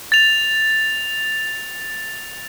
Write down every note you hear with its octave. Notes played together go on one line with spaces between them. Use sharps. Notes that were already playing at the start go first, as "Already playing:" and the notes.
A6 F7